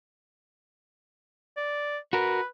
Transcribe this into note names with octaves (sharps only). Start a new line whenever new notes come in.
D5
F#4 A#4 B4